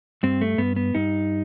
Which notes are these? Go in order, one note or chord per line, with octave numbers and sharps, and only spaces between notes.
G2 C4
A3
G2 B3
B3
G2 D#4